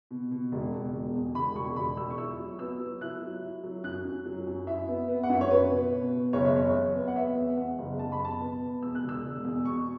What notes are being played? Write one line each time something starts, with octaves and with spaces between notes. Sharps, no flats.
B2
B2
E1
B2
E1
E2
E1 B5
E1 C#6
E1 B5
E1 E6
C#6
E4 E6
F#3
B3 E6
F#3
E4 F#6
F#3
E4
F#3
F#2 F#6
F#2
F#3
F#2
E4 E5
B3
B3
F#5
F#2 E5
C#5
B3 B4
B2
B2
B2
F#1 C#5
E5
E2 C#5
F#1
B3
F#5
B3 E5
E2
E2 F#5
F#1
F#1 A5
B5
B2
A5
B3
B2
E2 E6
F#6
E1
E6
E1
E2
B2 C#6